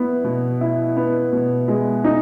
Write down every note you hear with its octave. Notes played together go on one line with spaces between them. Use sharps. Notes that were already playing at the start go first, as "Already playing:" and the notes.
Already playing: B3 E4
B2
E4
B3
B2
G#3
D#4